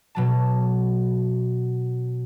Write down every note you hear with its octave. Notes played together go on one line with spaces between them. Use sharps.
B2 F#3 A5